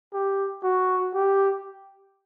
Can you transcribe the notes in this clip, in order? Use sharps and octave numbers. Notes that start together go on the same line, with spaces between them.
G4
F#4
G4